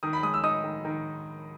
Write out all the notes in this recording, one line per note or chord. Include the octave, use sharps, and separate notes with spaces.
D#3 D#6
B5
G#3 D#6
E6
D#4 D#6
D#3
D#3